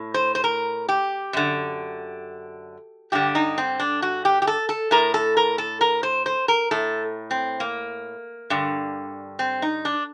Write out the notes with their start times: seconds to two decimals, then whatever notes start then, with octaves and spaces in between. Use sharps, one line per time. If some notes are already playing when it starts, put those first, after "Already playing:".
Already playing: A2
0.14 C5
0.35 C5
0.44 A#4
0.89 G4
1.33 F#2 D3
3.12 G2 D3 G4
3.35 D#4
3.58 C4
3.80 D4
4.02 F#4
4.25 G4
4.42 G4
4.47 A4
4.69 A4
4.91 A2 A#4
5.14 A4
5.37 A#4
5.58 A4
5.81 A#4
6.03 C5
6.26 C5
6.48 A#4
6.71 A2 A4
7.31 C4
7.60 A#3
8.50 G2 D3
9.39 C4
9.62 D#4
9.85 D4